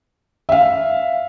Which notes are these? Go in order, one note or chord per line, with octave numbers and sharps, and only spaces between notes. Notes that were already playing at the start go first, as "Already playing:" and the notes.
E5 F5